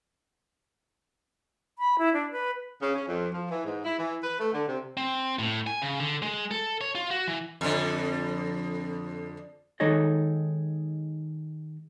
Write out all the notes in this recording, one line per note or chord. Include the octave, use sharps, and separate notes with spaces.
B5
E4
D4
B4
C#3
C#4
F2
F3
E3
G#2
E4
E3
B4
A3
D3
C3
C4
A2
G#5
C#3
D3
G#3
A4
C#5
F4
F#4
E3
F2 D3
D#3 G#3 D#4 A4 C#5 D#5